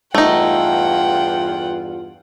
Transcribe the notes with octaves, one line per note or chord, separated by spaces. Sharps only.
E2 G2 A3 D#4 F4 F#5 G5